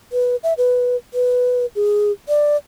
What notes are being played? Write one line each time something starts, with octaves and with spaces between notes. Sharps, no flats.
B4
E5
B4
B4
G#4
D5